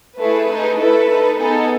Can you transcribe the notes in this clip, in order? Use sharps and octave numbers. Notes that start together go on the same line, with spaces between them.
A3 E4 G#4 B4
A3 D#4 G#4
A3 E4 A4 B4
D#4 A4
B3 D#4 G#4 A4